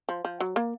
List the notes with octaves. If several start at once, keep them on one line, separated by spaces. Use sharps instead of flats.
F3
F3
F#3
A#3